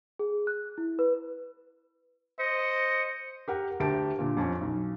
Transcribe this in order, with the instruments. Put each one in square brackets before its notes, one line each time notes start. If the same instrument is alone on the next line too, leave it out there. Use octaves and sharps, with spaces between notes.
[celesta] G#4
F#6
E4
B4
[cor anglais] C5 [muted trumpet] D#5 [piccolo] C#7
[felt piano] G4 A#4 F#5
D2 G4 A#4 E5 A5 D7
A#2 D3
F2 C#4
B1